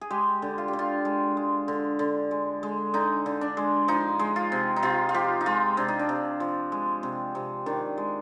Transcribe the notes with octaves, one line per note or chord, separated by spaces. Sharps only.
G#4
G#3 G4
D3
F4
G4
D3
F4
G#3
G#3
D3
D3
G#3
G#3
D3 D#4
D3
D4
G#3
F3 D#4
G#3
F4
C3
D#4
C3 F4
F4
F3 G4
D#4
G#3 F4
C3 D4
D#4
D4
C3
F3
G#3
C3
C3
D#3 D4
G#3